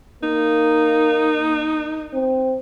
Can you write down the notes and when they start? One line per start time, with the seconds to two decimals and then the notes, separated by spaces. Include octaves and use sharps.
0.23 A#3 D#4
2.14 C4